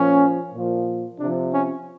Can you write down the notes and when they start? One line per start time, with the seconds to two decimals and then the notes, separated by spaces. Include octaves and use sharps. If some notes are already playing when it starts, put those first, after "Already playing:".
Already playing: A#2 F3 C#4
0.54 A#2 F3
1.20 C3 F3 D4
1.54 C#4